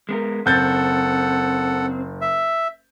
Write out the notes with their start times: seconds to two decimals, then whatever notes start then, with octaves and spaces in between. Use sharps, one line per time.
0.09 G#3 B3 A#4
0.46 F#1 C4 A4 F#5 G6 A6
2.21 E5